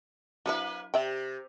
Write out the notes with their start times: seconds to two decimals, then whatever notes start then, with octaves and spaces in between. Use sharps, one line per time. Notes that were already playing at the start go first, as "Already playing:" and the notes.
0.46 F#3 A#3 D4 E4 B4
0.94 C3 D5 E5 G5